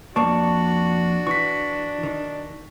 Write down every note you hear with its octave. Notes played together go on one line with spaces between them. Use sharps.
F2 A#3 D4 F#4 D5 A5 C#6
E3 C#6 B6
D#3